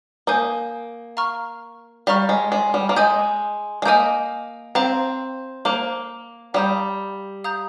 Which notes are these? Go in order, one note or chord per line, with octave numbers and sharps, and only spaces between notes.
A#3 A#4 F5 G#5 D#6 G6
F5 A#5 C#6 F6
G3 F5 A#5 C#6 F6
G#3
G#3
G3
A#3
G#3 D#5 G#5 D#6 G6
G#3
A#3 D#5 G#5 D#6 G6
C4 C5 F5 A#5
A#3 C5 F5 A#5
G3 F5 A#5 D#6 G6
F5 A#5 D#6 G6